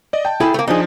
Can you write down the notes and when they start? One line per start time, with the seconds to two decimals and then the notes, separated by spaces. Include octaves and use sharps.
0.13 D5 D#5
0.25 G5 A5
0.40 E4 G#4 A4
0.54 A3 A#3
0.68 F3 D4 D#4 G#4